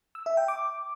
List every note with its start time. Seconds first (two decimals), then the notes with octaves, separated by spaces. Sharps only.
0.15 E6
0.26 E5
0.37 G5
0.48 D6